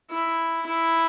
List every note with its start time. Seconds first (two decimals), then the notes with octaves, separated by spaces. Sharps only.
0.11 E4
0.66 E4